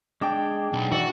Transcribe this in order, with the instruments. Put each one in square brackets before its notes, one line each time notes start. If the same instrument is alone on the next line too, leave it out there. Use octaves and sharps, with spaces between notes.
[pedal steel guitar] G#3 D6 [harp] D4 G5
[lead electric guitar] B1 [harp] D4
[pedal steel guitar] E3 D5 [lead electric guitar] F#4